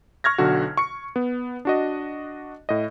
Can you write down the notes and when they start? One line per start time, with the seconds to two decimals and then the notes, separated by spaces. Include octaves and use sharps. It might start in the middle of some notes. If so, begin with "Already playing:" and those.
0.24 C#6 F6 G#6 A#6
0.38 B1 D3 F#4
0.77 C#6 C#7
1.16 B3
1.65 D4 F#4 D#5
2.69 A2 D#5